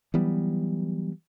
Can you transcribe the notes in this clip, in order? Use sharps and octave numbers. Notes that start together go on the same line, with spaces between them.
E3 F#3 G3 B3